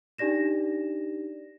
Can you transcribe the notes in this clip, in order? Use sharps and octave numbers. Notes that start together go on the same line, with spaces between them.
D4 D#4 G4 D5 A#6 E7